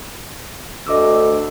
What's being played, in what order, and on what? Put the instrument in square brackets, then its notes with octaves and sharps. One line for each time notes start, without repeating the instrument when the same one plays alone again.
[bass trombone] D2 [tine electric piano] D#5 D6 E6